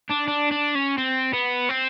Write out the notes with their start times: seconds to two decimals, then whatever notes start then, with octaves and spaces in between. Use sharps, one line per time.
0.10 D4
0.28 D4
0.51 D4
0.75 C#4
0.98 C4
1.34 B3
1.69 C4